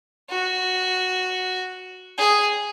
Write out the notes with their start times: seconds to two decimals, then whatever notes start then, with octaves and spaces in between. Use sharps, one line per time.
0.30 F#4
2.18 G#4